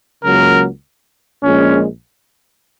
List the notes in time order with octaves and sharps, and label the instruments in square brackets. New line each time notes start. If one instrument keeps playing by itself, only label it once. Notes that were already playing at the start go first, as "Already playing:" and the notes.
[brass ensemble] C#2 C#3 F#3 A#3 A#4
A#1 A#2 G#3 C#4